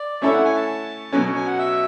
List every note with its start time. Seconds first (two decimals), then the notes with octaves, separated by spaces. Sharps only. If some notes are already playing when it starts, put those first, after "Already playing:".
Already playing: D5
0.22 A3 C#4 E4 A4 C#5 E5
0.33 F#5
0.45 G#5
0.56 A5
1.12 B2 F#3 C#4 G#5
1.35 G#5
1.47 F#5
1.58 E5